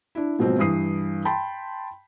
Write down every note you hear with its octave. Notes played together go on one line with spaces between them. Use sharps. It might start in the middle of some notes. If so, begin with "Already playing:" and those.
D4 E4
G#2 B2 F3 F#3 A#3 C4
G2 E3 D#6 C7
G5 A5 B5 C6